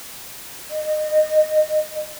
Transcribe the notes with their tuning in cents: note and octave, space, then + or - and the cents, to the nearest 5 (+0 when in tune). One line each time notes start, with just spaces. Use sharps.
D#5 -25